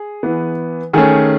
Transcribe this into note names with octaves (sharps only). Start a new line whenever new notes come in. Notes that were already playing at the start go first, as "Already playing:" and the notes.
Already playing: G#4
E3 B3
D#3 A3 C#4 G#4